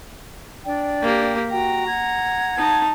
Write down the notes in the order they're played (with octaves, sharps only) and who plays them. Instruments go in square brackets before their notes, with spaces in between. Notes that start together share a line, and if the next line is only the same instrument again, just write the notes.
[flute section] D4 D5 G5
[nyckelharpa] A#3 G4
[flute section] F#4 G5 [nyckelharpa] A#5
[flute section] F#5 G#6
[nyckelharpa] D#4 A5